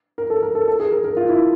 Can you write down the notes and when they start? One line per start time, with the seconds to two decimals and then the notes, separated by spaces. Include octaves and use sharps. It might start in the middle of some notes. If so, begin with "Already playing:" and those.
0.18 A#4
0.30 A4
0.43 A#4
0.55 A4
0.68 A4
0.80 G#4
0.92 A#4
1.04 A#4
1.17 F4
1.29 E4